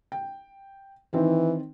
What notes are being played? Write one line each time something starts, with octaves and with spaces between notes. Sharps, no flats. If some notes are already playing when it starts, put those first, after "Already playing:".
G5
D#3 E3 C4